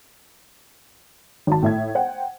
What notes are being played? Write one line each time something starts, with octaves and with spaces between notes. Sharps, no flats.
G#1 F#4 A5
A2 E5 G#6
C5 F#5 G5